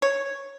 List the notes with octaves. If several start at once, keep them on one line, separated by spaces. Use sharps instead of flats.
C#5